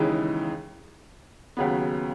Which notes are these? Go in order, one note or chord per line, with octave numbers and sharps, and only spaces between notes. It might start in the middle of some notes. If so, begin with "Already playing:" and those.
Already playing: D#2 C#3 E3 G#3 D#4
D#2 C#3 F#3 B3